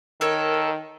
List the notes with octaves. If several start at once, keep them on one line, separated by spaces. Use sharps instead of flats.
D#3 A4 A#4 C#5